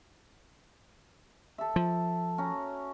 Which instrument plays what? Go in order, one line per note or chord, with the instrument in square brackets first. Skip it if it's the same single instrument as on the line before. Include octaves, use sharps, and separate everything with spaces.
[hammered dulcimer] A4 E5
[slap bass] F3
[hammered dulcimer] C#4 F#4 A#5